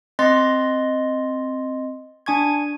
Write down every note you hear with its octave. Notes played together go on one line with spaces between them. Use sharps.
C4 D#5 C6 A6
D4 G#5 C#6 G#6